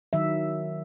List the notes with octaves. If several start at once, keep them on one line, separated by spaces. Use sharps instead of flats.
D#3 F#3 E5